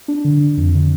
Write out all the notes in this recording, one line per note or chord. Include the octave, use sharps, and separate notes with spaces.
D4
D3
D3
F2
D3